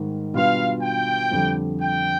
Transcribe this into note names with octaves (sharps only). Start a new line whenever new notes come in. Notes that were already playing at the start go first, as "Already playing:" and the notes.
Already playing: G#2 D#3 G3
B2 G3 D4 F4 B4 F5
G5
F2 D3 G3 D4
G5